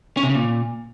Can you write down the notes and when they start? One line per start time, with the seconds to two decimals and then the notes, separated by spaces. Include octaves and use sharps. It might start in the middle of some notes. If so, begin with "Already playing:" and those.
0.17 C#4
0.23 C3
0.29 C#3
0.35 A#2